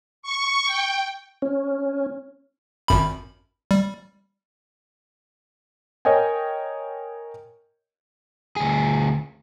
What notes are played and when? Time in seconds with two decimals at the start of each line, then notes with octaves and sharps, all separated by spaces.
0.23 C#6
0.66 G5
1.42 C#4
2.88 G#1 F#2 B5
3.71 G3
6.05 A#4 C#5 D#5 G5 G#5
8.56 D2 G#4